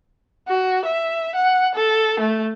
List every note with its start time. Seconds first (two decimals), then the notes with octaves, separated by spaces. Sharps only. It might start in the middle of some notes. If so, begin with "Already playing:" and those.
0.48 F#4
0.85 E5
1.35 F#5
1.75 A4
2.20 A3